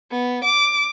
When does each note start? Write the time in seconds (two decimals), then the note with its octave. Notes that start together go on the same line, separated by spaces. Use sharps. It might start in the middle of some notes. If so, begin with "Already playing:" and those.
0.12 B3
0.45 D6